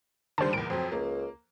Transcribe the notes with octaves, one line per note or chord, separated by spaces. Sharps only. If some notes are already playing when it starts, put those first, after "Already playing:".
D#2 D3 G3 C5 A5
E2 A#2 D7
F2 F#3 C4
C#2 A#3